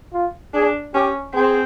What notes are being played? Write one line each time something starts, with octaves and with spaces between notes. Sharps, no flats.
F4
D4 G#4
C#4 G4
C4 G#4